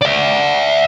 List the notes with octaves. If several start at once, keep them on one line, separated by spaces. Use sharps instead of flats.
D5 E5